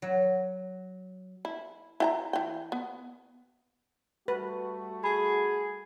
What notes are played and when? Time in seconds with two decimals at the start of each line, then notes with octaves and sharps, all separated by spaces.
0.02 F#3
1.45 E4
2.00 E4 G5 A#5
2.33 E3 G5
2.72 B3
4.28 G3 A3 F#4 B4
5.04 G#4 B5